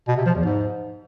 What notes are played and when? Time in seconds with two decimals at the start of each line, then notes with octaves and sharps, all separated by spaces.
0.08 B2
0.17 C3
0.26 F3
0.35 E2
0.44 G#2